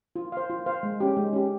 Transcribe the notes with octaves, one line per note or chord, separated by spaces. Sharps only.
F4
C5 F5
F4
C5 F5
G#3
C#4 G4
G#3
C#4 G4